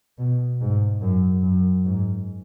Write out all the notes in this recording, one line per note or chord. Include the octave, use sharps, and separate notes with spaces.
B2
G#2
F#2
F#2
G#2